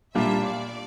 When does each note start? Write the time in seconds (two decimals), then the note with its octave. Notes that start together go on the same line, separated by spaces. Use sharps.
0.15 A#2 G3 A#3 D4 F4 E5
0.45 D5